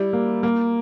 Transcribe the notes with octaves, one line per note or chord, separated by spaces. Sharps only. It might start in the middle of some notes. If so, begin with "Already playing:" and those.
Already playing: G3 E4
A#3
A#3